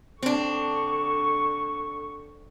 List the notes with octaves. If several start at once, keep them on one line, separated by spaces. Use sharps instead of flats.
D3 C4 D4 C#6